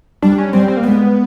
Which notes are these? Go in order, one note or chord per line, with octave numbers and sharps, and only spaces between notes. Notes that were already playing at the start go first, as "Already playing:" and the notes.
G3 D4
C#4
G3 C4
C4
A#3
G#3 B3